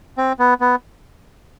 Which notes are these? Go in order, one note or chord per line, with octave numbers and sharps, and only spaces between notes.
C4
B3
B3